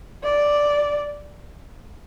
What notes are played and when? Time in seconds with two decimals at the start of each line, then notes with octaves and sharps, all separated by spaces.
0.23 D5